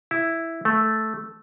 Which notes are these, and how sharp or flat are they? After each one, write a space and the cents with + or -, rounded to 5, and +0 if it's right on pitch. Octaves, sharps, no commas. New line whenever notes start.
E4 +0
A3 -5